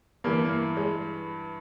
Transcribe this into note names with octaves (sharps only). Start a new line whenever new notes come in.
G2 E3 A#3
A#3
G#3